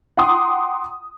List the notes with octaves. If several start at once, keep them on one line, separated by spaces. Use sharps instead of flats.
F#5 G5 A#5 C6 D6 D#6